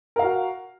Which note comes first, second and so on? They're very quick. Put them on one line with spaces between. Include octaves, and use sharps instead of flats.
A#4 F5 F#4